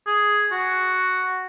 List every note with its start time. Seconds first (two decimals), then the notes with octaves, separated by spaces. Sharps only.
0.07 G#4
0.51 F#4